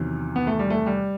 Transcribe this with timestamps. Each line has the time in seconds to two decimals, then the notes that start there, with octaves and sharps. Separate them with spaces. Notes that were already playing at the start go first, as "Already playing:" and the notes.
Already playing: E2 C3 D#3 F#3
0.36 B3
0.47 A3
0.59 G3
0.70 A3
0.86 G3